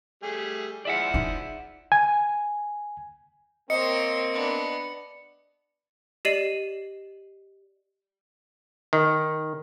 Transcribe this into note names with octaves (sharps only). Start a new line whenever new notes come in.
G3 A3 G#4
F3 G#3 E4 D5 E5 F#5
D#4
G#5
A#3 C4 C5 C#5 D#5 C#7
B3 D4
G4 D5 D#5 C7 D#7 F#7
D#3